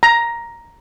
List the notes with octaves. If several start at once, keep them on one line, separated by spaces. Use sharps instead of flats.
A#5